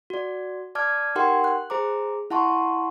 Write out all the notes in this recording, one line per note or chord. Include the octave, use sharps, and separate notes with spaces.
F#4 D5
D5 A5 D6 F6 G#6
D#4 G4 A#4 F#5 G5 C6
F#6
G#4 C5 A#5 D6
E4 F#5 A5 C6 C#6